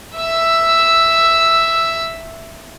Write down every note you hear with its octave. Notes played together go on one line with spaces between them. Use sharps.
E5 E6